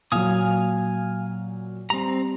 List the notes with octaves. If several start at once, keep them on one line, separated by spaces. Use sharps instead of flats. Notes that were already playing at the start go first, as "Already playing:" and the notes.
A#2 F#3 F5 G#5 D#6
G3 C4 A#5